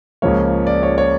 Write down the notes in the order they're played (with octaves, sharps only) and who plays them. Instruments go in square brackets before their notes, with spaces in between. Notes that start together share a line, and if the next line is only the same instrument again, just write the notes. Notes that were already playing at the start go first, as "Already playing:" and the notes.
[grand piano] C#2 C#3 F3 A#3 C#5
D5
C#5
C#5